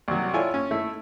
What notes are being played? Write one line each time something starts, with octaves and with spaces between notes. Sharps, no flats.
C2 F#3
E4 F4 A4 C#5 D5 G#5
C#4
A3 E4